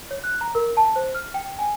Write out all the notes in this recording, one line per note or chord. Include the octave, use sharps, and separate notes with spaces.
C#5
F#6
A#5
A#4
A5
C5
F6
G5
G#5